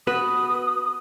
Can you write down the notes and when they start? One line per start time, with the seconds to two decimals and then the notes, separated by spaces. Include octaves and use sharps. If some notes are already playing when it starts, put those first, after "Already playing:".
0.07 B3 F#4 B4 D#6